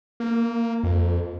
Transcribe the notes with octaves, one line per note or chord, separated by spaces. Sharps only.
A#3
F2